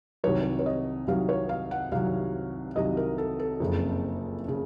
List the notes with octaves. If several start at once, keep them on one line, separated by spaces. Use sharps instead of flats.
C2 C3 D#3 F#3 C#5
C#5
D#5
C2 C3 D#3 F#3 F5
C#5
F5
F#5
C2 C3 D#3 F#3 F5
C2 C3 D#3 F#3 D#5
A#4
A4
A4
F#1 F2 C#3
C#3